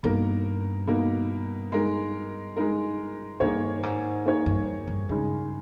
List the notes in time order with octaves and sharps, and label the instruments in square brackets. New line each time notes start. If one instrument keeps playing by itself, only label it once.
[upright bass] G2 [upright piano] B2 A#3 D#4 A#4
[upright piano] B2 A#3 D#4 A#4
G#3 D#4 A#4
G#3 D#4 A#4
[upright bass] G2 [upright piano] D#3 A#3 D#4 G#4 C#5
[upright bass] G#2
[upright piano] D#3 A#3 D#4 G#4 C#5
[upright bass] G2
G2
[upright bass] G2 [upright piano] C#3 G#3 D#4 G#4